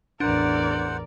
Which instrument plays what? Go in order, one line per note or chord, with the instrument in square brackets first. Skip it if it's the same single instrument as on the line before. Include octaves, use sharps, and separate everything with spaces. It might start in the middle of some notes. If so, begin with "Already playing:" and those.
[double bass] A1 E2 [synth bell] D4 [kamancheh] A#4 D5 [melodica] C5 F#5